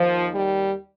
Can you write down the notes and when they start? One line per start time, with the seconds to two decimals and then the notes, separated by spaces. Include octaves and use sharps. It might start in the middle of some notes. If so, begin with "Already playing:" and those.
Already playing: D#2 D#3 F3
0.31 G3